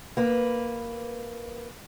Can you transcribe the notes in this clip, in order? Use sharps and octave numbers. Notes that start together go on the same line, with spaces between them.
A#3 B4